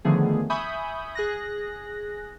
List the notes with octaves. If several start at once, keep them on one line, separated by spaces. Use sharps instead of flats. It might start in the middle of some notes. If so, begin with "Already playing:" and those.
D3 D#3 F3 A3 B3 G#4
E5 G#5 B5 C#6 D#6 G6
G#4 F#6 A#6